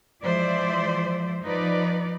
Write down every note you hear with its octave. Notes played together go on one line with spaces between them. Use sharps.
E3 F3 G#3 C5 D5 E5
F3 D#4 B4 D5